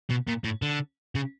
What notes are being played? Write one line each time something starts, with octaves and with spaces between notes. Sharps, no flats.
B2
A#2
A2
D3
C#3